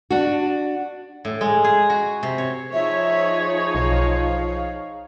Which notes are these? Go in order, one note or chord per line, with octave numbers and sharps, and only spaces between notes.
D4 F#4
A2
G#3
G#4
F#4
C3
C#5
F3 D#4 G#4 C#5 E5
B1 F5